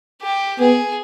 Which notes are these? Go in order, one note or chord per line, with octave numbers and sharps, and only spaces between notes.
G4
B3 G#4